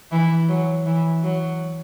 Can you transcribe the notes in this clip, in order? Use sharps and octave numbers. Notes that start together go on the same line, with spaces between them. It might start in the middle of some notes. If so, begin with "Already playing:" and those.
E3
F#3
E3
F#3